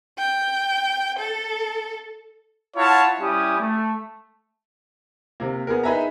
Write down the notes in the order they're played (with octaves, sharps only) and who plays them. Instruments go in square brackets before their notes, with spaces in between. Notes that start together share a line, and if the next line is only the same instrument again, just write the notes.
[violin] G5
A4
[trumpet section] E4 F4 C#5 F5 F#5 A5
G3 C#4 E4 G4 G#5 D#6
A3
[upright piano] C3 A#3
B3 G#4 A#4
D#4 G#4 B4 E5 G#5 A#5